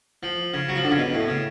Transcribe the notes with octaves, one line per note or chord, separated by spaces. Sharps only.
F3
C#3
F#3
F3
D3
C#3
B2
A2
C#3